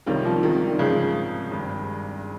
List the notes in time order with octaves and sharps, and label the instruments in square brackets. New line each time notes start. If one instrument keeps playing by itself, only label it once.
[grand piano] C2 C3 G3 C#4 F4 [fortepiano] D#3
[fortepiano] F3
D#3
[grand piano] G#2 F3 C4 D#4 [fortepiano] C#3
[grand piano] G#1 G2 G3